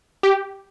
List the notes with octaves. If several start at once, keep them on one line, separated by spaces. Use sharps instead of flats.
G4